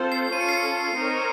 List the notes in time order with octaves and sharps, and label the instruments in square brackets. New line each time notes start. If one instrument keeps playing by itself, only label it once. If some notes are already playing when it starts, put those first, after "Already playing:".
Already playing: [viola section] C4 F4 A4 C5
[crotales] C7
[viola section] C#4 F4 A4 [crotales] D#7
[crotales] C#7
C7
C#7
[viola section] C4 D#4 A#4 C#5